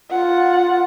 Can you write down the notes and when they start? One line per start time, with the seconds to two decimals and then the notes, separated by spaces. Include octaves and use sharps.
0.10 F4 F#5